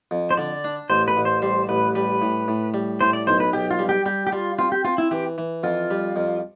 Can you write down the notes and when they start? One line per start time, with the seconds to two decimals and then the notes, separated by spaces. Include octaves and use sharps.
0.11 F2
0.31 C5
0.37 D3 D5
0.64 D4
0.90 A1 C5
1.08 B4
1.17 A1
1.25 C5
1.42 G3 C5
1.69 A1 B4
1.95 G3 B4
2.22 A2
2.48 A2
2.74 G3
3.01 A2 C5
3.13 D5
3.27 B1 C5
3.40 B4
3.53 B1 G4
3.71 F4
3.79 G3
3.89 G4
4.06 G3 G4
4.27 G4
4.32 G3 F4
4.59 C4 F4
4.72 G4
4.85 C4 F4
4.98 E4
5.11 E3 G4
5.38 E3
5.63 F2 F4
5.91 G3
6.16 F2